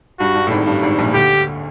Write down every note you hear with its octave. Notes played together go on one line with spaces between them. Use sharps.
G2 F#4
G2
A2
G#1 G#2
G2
G#1 G#2
A#1 A#2
D2 D3 G4